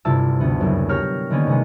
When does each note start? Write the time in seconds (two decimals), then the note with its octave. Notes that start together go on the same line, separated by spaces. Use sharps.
0.05 G1 C3 E4 F4 A5 E6
0.40 D2 B3
0.61 F#1
0.89 G4 A#4 C#5 F6
1.31 D3 D#3 A#3 B3 C#4
1.47 C3 G#3 B3